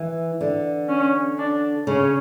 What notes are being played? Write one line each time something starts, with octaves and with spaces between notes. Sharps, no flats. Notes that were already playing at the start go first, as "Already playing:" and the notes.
Already playing: E3
D3
C#4
D4
C#3 C#4